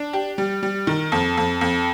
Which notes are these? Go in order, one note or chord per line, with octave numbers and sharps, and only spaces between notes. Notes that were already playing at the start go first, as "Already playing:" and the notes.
Already playing: D4
G4
G3
G3
D#3
F2
F2
F2